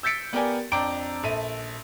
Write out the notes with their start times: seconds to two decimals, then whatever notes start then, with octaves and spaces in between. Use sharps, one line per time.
0.03 E6 G6 A6 B6 C#7 D7
0.33 B3 G4 A#4 D5 G5 G#5
0.72 F2 D4 G5 A#5 D6 D7
1.23 A#1 A4 E5 D#7